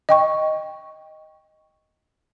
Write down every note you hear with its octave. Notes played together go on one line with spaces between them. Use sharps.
D#5 G5 C#6